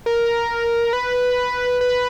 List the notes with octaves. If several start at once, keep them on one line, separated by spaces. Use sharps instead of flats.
A#4
B4
B4